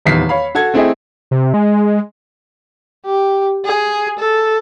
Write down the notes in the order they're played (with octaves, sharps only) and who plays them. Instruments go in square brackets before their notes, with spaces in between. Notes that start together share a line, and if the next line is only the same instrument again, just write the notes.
[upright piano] D#1 E2 D#3 B6 C7
C#5 F5 B5
F#4 A4 G#6
A3 C4 E4 G#4 D#5 G5
[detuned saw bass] C3
G#3
[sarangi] G4
G#4
A4